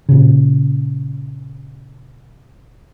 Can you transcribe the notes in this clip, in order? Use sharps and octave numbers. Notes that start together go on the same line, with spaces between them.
A#2 C#3